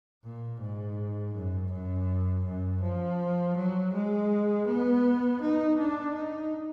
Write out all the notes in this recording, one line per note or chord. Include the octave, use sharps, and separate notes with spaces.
A#2
G#2
F#2
F#2
F#2
F3
F#3
G#3
B3
D#4
D4
D#4